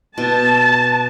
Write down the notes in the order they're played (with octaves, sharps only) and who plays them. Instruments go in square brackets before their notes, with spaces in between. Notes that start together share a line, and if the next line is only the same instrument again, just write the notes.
[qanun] B2 [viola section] A5